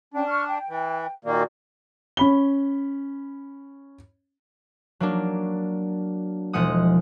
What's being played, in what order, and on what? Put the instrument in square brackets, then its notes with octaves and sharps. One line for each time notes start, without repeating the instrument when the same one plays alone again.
[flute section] C#4 G5 [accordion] D4
[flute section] C#6 F6
G5
[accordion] E3
[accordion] A#2 D#3 A#3 [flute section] F#4 D5
[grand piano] C#4 B5 G7
[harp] F#3 A#3 D4
E1 F3 G#3 F#5 D#6